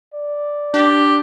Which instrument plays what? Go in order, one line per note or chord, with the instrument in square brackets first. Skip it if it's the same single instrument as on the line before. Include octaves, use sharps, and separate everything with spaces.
[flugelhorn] D5
[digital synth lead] D4 [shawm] G4